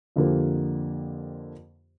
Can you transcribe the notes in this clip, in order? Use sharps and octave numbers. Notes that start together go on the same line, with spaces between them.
F2 D3 F3 A#3 G4